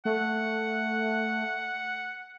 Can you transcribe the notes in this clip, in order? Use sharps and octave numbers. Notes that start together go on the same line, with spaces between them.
A3 F#5